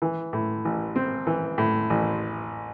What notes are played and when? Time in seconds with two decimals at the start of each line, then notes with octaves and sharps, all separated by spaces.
0.02 E3
0.33 A2
0.65 A1
0.96 C4
1.27 E3
1.58 A2
1.90 A1